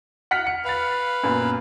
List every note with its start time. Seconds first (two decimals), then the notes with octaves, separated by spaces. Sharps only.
0.31 F#5 F6 B6
0.47 C#7
0.65 B4 F5 A6 F7
1.23 F#2 A#2 B3